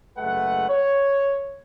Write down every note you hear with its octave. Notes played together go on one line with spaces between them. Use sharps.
F#1 G#3 A3 B4 F#5
C#5